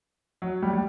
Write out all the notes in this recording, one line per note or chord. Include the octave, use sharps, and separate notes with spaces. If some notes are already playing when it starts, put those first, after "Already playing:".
F#3
G3
G3